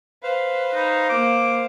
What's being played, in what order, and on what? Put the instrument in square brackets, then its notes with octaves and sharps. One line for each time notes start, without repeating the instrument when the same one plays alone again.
[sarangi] B4 [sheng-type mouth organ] C5 F5
[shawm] D#4
[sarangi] A#3 [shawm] D6